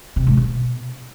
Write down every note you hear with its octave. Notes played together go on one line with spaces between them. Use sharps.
C3
G#2
B2